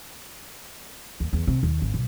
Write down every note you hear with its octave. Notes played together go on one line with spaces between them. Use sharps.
D#2
E2
C3
D#2
G#1
B1